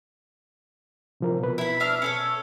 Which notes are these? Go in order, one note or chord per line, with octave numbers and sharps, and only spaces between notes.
C3 F3 A#4
B2 B4
E4 B5
D4 E5 F6
C#4 A4 C#5